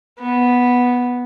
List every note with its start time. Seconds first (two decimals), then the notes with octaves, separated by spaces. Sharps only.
0.19 B3